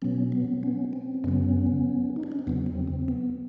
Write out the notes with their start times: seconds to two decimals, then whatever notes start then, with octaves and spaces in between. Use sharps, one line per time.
0.02 B2 F#3 B3 C#4
0.32 B3
0.63 B3 C#4
0.93 C4
1.24 F#2 C#3 F#3 B3 C#4
2.16 D#4
2.23 D4
2.32 C#4
2.39 C4
2.47 E2 C#3 F#3 B3
2.66 C4
2.87 C4
3.08 B3